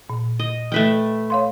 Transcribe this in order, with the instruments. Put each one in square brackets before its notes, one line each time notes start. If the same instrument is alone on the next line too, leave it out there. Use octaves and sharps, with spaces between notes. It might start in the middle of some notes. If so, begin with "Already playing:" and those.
[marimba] A#2
[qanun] D#5
[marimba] E3 [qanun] A3 B4 G5
[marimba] C#5 F5 C6